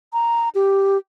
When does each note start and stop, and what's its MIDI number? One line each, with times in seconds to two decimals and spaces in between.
0.13 0.49 82
0.55 0.98 67